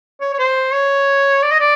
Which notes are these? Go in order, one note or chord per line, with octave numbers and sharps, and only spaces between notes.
C#5
C#5
C5
C#5
D5
D#5
D5